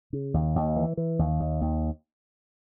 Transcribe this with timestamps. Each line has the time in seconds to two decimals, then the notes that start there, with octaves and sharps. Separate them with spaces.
0.13 C#3
0.34 D#2
0.55 D#2
0.76 E3
0.97 E3
1.19 D#2
1.40 D#2
1.61 D#2